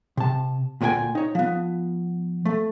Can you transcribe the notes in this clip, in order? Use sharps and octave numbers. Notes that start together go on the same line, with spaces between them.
C3 A5
D2 A#2 C#4 G#4 G5 G#5
D#4 C#5
F3 B3
A3